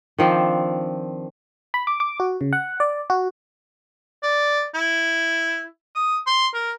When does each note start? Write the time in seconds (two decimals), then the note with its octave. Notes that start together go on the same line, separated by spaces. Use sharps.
0.18 D#3 F3 C4 D4
1.74 B5
1.87 D6
2.00 D6
2.20 F#4
2.41 C#3
2.53 F#5
2.80 D5
3.10 F#4
4.23 D5
4.75 E4
5.96 D#6
6.27 C6
6.54 A#4